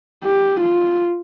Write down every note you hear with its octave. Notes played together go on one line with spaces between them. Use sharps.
G4
F4